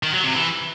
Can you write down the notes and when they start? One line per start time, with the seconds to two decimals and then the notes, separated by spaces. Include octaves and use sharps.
0.03 D#3
0.13 F#3
0.24 C3
0.34 E3